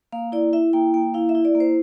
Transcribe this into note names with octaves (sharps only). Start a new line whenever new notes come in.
A#3 F5
E4 D5
E4 E5
A#3 G5
A#3 G5
E4 F5
E5
E4
D5
A#3
C5